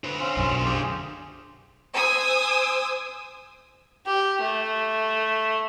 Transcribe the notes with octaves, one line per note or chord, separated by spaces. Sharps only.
D3 B4 C5
C4 C#4 F4
B1 F#2
F4 G4 G#4
C5 G#5 D#6 E6
G4
A3